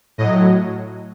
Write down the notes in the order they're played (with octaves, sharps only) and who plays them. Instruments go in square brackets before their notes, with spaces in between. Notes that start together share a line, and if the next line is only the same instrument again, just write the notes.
[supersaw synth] A2 F#3 D#5